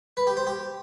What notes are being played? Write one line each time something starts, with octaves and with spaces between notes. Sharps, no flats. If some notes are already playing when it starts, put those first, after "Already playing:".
B4
G4
C5
G4